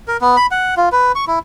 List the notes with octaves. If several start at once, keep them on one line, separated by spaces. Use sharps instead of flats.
A#4
B3
B5
F#5
F4
B4
C#6
E4